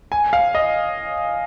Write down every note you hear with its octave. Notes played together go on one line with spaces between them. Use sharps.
G#5
F5
D#5